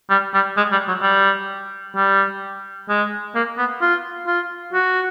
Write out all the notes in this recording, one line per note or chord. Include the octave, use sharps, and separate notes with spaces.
G3
G3
G#3
G3
F#3
G3
G3
G#3
A#3
B3
F4
F4
F#4